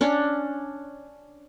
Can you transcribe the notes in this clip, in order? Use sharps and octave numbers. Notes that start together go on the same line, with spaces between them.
C#4 D4 C#5